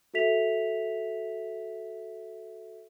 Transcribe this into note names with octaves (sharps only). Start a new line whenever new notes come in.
F#4 A4 E5 B6 F7